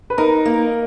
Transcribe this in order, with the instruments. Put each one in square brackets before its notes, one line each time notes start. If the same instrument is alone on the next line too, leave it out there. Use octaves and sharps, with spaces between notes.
[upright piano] B4
[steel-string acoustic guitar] D#4 [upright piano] A#4
[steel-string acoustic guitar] A#3